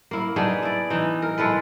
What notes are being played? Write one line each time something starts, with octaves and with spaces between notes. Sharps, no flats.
A#3 E4
B3 D4 D#4 G#4
E4 D5
E3 D#4
A#4
G#3 E4 A4 B4